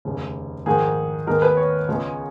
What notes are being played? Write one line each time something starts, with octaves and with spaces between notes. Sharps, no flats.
F1 D#2 C#3
A#1 G#2 D#3 G#4
D#2 D#3 G#3 B3 A#4
B4
C#5
C#2 C#3 G#3 B3